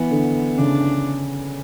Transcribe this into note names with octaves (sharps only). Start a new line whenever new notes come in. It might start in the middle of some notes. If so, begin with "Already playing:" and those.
Already playing: E3 B3
D3
C#3 D4